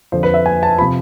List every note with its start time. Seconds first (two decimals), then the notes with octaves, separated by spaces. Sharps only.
0.12 F2 D3 F3 C5
0.23 B4
0.34 E5
0.46 G#5
0.63 A5
0.79 C3 F3 B5